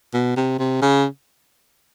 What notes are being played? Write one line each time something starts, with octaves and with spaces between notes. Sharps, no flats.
B2
C3
C3
C#3